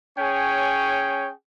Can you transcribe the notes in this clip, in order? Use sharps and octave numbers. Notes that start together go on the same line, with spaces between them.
C#4 G#4 C#5 G5